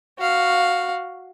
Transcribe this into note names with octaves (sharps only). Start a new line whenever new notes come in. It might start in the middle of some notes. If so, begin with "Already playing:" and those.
F#4 F5